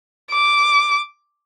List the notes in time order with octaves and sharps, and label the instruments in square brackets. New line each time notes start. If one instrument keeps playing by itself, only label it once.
[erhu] D6